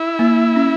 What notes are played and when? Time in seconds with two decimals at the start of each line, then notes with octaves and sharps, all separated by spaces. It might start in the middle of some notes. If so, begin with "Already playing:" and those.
Already playing: E4
0.19 A#3
0.56 C#4